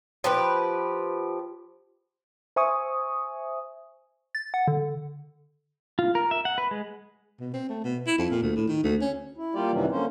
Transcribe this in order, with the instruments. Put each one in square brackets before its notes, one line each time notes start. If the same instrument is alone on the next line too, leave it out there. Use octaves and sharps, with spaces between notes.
[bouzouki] F3 G4 B4
[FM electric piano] C5 E5 G#5 C#6 D#6
[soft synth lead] A6
F#5
D3
[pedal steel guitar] F4
A#4
E5
F#5
B4
G#3
[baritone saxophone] B2
C4
A3
B2
E4
F2
A#2
D2
A2
D#3
D2
C#4
[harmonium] E4
G3 A#3 F4 G4 D5
F#2 C3 D#3 E3 F#3 G3
D3 A#3 C#4 C5